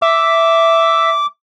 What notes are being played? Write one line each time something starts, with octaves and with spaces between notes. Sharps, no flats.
E5 D6